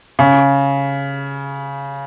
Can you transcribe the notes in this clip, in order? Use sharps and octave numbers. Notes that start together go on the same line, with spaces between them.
C#3